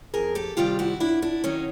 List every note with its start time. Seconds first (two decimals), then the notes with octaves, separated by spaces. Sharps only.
0.14 F2 G#4 A#4
0.35 G4 A4
0.57 C3 D#3 G3 F4 G4
0.79 E4 F#4
1.00 F#2 D4 E4
1.22 D4 E4
1.44 D#3 F#3 C#4 D#4